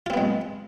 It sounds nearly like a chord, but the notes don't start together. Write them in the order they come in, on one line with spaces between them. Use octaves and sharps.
F4 C4 B3 G#3